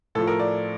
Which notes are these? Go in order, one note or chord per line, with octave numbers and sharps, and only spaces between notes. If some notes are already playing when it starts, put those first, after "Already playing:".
A2 F3 A4
A#4
D5